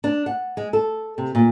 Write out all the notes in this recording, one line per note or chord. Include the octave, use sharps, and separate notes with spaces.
D4
F#5
G#3
A4
C3
A#2